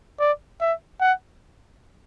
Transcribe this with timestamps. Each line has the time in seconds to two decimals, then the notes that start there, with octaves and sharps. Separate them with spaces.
0.20 D5
0.61 E5
1.01 F#5